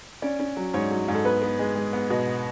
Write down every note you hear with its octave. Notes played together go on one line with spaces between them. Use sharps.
C#4 D5
C#4
F#3
G#2 C#5
F#3
G#2
A4
B3 B4
B3
G#3
G#3
B3
B2